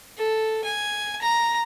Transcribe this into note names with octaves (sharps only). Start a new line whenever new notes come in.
A4
G#5
A#5